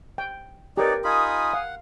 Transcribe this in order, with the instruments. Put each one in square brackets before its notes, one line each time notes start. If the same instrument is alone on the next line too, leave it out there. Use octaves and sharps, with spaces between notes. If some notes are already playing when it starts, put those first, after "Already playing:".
[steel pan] G5
[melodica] D#4 [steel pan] G4 A#4 [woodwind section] B4 C#5 D5
[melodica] D#4 F4 B5 [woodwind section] G#5 D#6
[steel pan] F5 [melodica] F#5